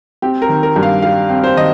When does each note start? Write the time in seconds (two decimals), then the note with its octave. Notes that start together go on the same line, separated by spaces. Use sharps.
0.22 C4 G4
0.42 A#4
0.49 D#3
0.63 A#4
0.76 G2
0.83 F5
1.02 G3 F5
1.30 C4
1.44 C5
1.57 D#3 D#5